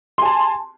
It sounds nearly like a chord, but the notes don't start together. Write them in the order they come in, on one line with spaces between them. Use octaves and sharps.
C6 G#5 A5